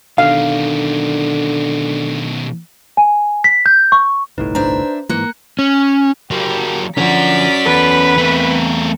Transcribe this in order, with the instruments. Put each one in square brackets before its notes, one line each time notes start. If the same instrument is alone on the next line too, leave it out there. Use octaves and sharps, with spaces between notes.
[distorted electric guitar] B2 D#3 [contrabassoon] D3 [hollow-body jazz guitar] F5
[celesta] G#5
B6
G6
C#6
[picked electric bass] G1 C2 A2 [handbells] D#4 B4
[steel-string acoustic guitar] D4 E5 [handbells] B4 C5 A#5
[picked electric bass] G#2 E3 [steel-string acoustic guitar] A#3 [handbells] A#5 F#6 C#7
[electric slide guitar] C#4
[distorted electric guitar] F#3 A#3 [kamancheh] G4
[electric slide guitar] D3 F3 [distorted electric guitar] C#4 F#4 [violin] D5 B6 [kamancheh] A#5
[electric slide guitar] E2 A4 [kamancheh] B4 B5
[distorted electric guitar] A3 A#4 [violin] C4